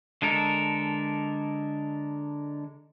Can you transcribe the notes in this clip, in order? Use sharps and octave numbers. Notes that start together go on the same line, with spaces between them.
D3 G#3 A4 A#4